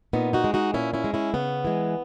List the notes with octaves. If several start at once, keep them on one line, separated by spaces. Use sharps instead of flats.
A#2 B3 D#4
D#4 F#4
G#3
D#4 F#4
A#2 C#4 E4
C#4 E4
G#3
C#4 E4
C#3 B3
E3 G#3